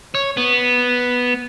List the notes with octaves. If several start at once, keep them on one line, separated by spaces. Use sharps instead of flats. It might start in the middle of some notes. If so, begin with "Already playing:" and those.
C#5
B3